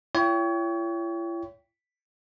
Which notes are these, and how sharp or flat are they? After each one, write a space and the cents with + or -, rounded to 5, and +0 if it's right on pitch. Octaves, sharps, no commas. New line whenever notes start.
E4 +45 C#5 +30 G5 +0